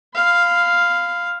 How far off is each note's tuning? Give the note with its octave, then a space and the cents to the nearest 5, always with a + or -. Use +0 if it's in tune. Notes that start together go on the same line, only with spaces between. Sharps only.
F5 +0 B5 +35